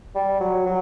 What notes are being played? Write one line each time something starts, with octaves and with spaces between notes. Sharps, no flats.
G3
F#3
F#3